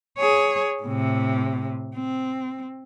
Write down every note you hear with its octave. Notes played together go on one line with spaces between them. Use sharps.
G#4 C#5
A2 C3
C4